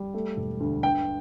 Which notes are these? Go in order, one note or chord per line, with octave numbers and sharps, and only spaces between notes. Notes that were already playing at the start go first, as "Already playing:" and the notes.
Already playing: G3
A3
E1
D2
G2 G5